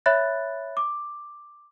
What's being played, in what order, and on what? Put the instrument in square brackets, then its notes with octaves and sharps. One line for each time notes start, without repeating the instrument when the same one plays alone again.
[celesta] C#5 E5 B5 F#6 A6
D6